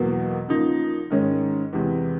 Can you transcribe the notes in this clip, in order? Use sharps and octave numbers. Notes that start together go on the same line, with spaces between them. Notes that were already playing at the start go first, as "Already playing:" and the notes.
Already playing: E2 B2 F#3 A#3
C#3 F3 A#3 D#4
G#2 D#3 G#3 C#4
E2 C3 E3 G#3